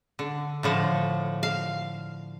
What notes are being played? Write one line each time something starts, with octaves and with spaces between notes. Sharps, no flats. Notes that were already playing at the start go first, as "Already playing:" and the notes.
D3
A2 D3 F3
F5